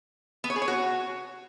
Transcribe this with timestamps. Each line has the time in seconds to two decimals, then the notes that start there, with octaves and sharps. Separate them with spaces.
0.44 B3
0.50 C#5
0.56 G#4
0.62 C#5
0.68 F#4